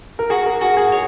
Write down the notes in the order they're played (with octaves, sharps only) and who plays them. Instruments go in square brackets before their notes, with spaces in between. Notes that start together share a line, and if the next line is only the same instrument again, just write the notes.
[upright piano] A#4
[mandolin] F#4 [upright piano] G#4
[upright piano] A#4
[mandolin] F#4 [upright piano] G#4
[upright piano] G#4
[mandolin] C#5